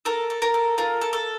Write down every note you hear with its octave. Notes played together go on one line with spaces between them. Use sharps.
A4 A#4
A4
A#4
A4
F4 A#4
A4
A4